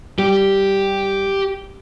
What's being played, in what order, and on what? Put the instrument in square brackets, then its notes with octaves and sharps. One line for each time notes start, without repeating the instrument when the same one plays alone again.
[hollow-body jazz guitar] G3 [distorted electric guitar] G4